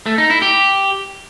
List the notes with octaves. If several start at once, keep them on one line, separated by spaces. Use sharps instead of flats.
A3
D#4
E4
G4